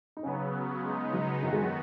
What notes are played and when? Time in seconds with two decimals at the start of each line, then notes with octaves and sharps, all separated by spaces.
0.17 D#4
0.23 C#3 F#3 B3 C#4
0.83 C#3 G#3 B3 D#4
1.13 F#3
1.42 F#2 D#3 F#3 B3 F#4
1.53 G#3
1.63 F#3